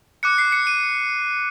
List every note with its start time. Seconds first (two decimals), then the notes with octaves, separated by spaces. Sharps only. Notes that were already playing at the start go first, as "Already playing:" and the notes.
0.23 D6 F#6 C#7
0.38 C7
0.52 C#7
0.67 D#7